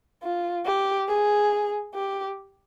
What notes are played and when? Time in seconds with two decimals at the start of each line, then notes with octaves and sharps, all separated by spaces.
0.23 F4
0.66 G4
1.09 G#4
1.94 G4